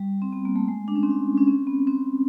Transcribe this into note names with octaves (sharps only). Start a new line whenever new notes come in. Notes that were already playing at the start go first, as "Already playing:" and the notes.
Already playing: G3
C4
B3
A#3
A3
G#3
D4
C#4
C4
C#4
C#4
C4
B3
C4